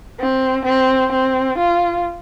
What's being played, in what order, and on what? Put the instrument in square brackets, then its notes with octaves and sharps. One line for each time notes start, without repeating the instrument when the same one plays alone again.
[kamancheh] C4
C4
C4
F4